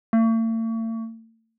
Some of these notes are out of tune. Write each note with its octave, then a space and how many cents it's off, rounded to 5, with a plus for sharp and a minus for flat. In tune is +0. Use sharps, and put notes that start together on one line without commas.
A3 +45